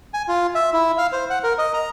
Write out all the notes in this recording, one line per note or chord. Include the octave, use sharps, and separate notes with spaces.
G#5
F4
E5
E4
F5
C5
F#5
A#4
D#5
A#5